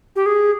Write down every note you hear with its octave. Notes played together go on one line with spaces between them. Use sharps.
G4
G#4